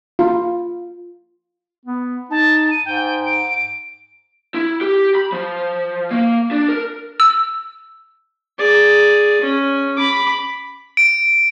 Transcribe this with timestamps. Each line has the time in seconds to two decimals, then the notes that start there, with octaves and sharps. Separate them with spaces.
0.19 F4
1.86 B3
2.31 D#4 A5
2.71 D#7
2.86 G#2 G5
3.26 D7
4.55 E4
4.81 G4
5.15 B5
5.32 F3
6.10 A#3
6.51 D4
6.68 A#4
7.20 E6
8.58 G#4 D5
9.41 C#4
9.97 B5 D6
10.97 D7